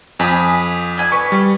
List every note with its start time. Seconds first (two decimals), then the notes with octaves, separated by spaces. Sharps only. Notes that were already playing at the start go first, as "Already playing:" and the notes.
0.19 F2 G#5 B5 D#6
0.98 D5 G#5
1.12 B4 C#6
1.32 G3